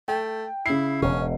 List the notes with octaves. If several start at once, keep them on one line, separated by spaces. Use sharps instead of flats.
A3 G5
C#3 E4 C7
E1 B2 C#4